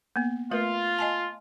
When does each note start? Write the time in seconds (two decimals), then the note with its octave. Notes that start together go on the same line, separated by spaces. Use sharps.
0.16 A#3 B3
0.51 A3 F4 A#4 B4
0.99 D#5 G#5 A5